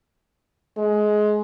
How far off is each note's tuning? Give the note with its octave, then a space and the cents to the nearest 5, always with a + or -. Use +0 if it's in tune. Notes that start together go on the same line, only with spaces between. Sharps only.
G#3 +20